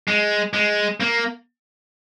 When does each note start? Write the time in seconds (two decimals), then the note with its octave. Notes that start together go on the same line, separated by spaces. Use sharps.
0.08 G#3
0.53 G#3
1.00 A#3